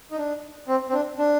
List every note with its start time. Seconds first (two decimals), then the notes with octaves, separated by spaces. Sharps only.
0.11 D#4
0.18 D4
0.68 C4
0.89 C4
0.93 D4
1.18 D4